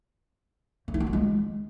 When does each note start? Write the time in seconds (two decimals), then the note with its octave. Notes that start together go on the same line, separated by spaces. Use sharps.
0.88 A3
0.94 E4
1.00 D#4
1.07 F4
1.13 G#3